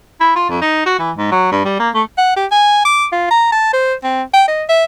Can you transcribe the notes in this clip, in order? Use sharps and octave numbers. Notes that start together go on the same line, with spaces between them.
E4
F4
F2
D#4
F#4
E3
G#2
F#3
G2
G3
A#3
A3
F#5
G4
G#5
D6
F4
A#5
A5
C5
C4
G5
D#5
E5